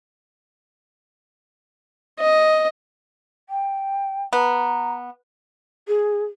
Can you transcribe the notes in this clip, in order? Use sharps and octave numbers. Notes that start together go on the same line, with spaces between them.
D#5
G5
B3 A#5
G#4